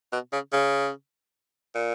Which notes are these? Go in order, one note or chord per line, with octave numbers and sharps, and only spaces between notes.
B2
C#3
C#3
A#2